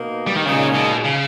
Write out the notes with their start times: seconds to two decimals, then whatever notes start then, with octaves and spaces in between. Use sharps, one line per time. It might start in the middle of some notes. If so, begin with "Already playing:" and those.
Already playing: B2 A#3 D#4
0.27 G3
0.36 D#3
0.45 A#2 C#3 G#3 D#4 G#4
0.74 B2
1.04 C#3